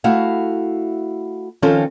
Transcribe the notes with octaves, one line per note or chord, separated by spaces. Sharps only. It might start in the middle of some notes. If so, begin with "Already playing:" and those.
A3 E4 F#4 F5
D#3 F3 C4 C#4 F4 A4